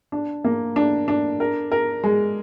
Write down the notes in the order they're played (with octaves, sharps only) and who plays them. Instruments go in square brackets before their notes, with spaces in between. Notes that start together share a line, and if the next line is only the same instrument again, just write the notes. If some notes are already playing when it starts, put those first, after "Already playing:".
[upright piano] D4
A#3
D4
D4
A#4
A#4
G#3